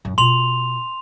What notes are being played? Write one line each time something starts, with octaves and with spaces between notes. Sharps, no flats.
F#2
B2 F4 C6 F7